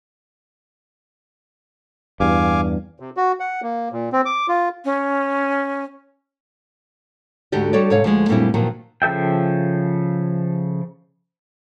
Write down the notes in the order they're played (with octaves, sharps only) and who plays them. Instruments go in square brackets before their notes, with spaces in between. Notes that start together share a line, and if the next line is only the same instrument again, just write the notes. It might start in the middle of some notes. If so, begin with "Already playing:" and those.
[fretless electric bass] E2 G2 [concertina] F5 G#5 D6
[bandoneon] C3
F#4
F#5
A#3
A#2
C4
D6
F4
[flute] C#4
[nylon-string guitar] D2 G#2 D3 F#4 G4 D5
G3 F#4 A4 C#5 D5
G#2 C3 C#5 F5
D2 F3 G#3
F#2 A#2 G3 C4 D4 E4
G2 A#2 D#3 F3 F#3
[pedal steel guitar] C#3 F3 A4 E5 G5